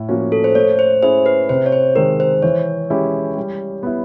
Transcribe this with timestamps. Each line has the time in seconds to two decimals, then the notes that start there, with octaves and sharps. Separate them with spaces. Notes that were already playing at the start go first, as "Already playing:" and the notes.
Already playing: A2
0.09 F3 A#3 C#4 F#4
0.32 A4
0.44 C5
0.55 A3 C#5
0.79 C5
1.03 C#4 E4 G#4 C5
1.26 B4
1.49 C3 C5
1.66 C#5
1.72 C5
1.96 D#3 G#3 A#4
2.20 C5
2.42 E3 C#5
2.90 G#3 C#4 E4 G4
3.37 G3
3.83 B3 E4